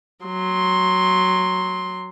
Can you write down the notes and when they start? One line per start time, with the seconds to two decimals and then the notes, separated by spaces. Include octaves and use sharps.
0.25 F#3 C6